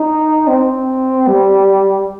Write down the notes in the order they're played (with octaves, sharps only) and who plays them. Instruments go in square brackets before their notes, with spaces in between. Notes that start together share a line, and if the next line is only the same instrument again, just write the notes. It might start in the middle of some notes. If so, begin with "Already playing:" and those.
Already playing: [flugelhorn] D#4
C4
G3